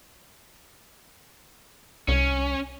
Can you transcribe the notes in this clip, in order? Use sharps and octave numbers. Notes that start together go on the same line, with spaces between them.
C2 C#4